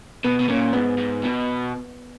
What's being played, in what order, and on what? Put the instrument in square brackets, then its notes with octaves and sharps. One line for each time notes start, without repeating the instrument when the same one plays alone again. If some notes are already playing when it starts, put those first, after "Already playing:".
[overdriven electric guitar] B2 [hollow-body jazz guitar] B3
[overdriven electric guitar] B2
[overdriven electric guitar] A#2 [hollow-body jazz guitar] C#4
[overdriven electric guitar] G#2 [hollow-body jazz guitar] B3
[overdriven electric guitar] G#2
B2